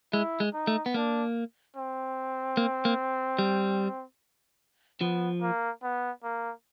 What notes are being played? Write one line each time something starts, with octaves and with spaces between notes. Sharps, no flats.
G#3 E4
G#3
D#4
A3
B3
A#3 D4
C4
A#3
A#3
G3
F3 B3
A#3
B3
A#3